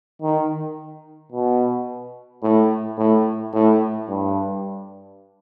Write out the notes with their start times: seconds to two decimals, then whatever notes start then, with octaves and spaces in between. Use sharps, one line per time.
0.22 D#3
1.32 B2
2.43 A2
2.97 A2
3.53 A2
4.08 G2